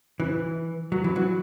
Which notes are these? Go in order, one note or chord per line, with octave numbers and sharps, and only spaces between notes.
E3
F#3
E3
F#3